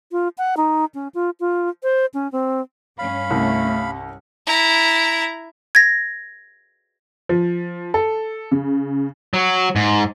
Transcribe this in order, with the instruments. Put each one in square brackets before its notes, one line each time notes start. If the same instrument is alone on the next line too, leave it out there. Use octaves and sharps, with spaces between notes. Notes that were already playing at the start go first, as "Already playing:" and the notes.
[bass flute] F4
F#5
D#4
C#4
F4
F4
C5
C#4
C4
[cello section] G2 C#4 [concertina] F5 B5
[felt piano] C2 [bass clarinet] A3
[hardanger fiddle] E4 A#5
[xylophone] G#6 A#6
[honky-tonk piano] F3
A4
C#3
[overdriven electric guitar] F#3
G#2